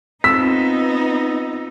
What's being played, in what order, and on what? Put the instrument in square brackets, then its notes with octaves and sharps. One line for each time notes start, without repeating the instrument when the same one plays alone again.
[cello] B3 D#4 [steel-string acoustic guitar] C4 F4 A5 [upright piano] E6 [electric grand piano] B6